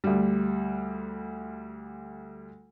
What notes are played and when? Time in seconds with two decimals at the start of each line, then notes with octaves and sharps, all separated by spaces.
0.04 D2 G3